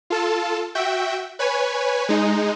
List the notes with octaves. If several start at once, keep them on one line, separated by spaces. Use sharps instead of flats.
F4 A4 A5
F#4 E5 G5
B4 C#5 G#5
G#3 D#4